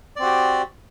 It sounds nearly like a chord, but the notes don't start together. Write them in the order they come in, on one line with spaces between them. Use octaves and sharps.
D5 C4 F#4 G4